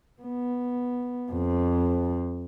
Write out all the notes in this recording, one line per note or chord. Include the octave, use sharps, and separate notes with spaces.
B3
F2